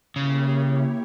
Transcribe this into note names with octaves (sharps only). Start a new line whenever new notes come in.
C#3 A#3 E4 G4 C#5